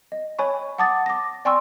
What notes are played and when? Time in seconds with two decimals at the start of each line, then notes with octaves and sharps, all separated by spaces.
0.12 D#5
0.39 C#5 G#5 B5 C#6
0.78 F#5 A5 D6 D#6 A6
1.06 D6 A#6
1.45 D5 G5 G#5 C6 C#6 E6